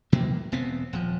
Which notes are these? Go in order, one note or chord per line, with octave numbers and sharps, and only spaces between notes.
B2 E3 F#3 A#3
E1 B3 C4
D#1 F3